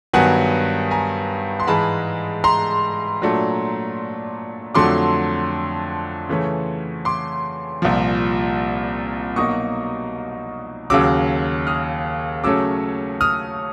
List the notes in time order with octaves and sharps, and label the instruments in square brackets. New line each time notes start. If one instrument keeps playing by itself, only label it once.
[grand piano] G2 D#3 F#3 B3 F#5 G#5
G#5 A#5
C6
G#2 E3 G#3 A5 B5
A#5 C6
A#2 F#3 A3 D4
F2 D3 F#3 A3 C6 D6
C#3 E3 A3 C#4
C6 D6
C2 A#2 F3
B2 F#3 A#3 D#4 C#6 D#6
D#2 C#3 F#3 D6 E6
D#6 F6
C#3 F#3 A3 C#4 D6 E6
D#6 F6